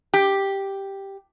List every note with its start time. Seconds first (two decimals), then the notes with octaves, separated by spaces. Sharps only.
0.14 G4